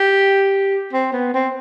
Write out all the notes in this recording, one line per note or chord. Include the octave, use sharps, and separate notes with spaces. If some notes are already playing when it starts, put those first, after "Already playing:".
Already playing: G4
C4
B3
C4